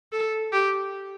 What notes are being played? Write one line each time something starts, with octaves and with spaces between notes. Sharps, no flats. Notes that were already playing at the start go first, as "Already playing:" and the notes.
A4
G4